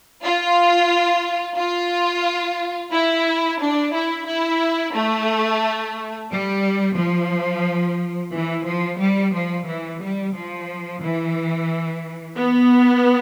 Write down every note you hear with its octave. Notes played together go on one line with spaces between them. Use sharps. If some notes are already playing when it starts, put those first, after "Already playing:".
F4
F4
E4
D4
E4
E4
A3
G3
F3
E3
F3
G3
F3
E3
G3
F3
E3
B3